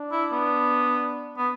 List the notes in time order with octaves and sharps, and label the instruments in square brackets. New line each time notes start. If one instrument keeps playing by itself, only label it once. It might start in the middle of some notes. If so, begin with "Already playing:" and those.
Already playing: [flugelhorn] D4
[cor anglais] E4
B3
B3